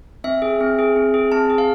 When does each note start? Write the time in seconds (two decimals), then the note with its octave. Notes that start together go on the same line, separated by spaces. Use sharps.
0.24 C4 E5
0.42 G#4
0.61 C4
0.79 G#4
0.96 C4
1.14 G#4
1.32 C4 A5
1.50 G#4
1.58 F5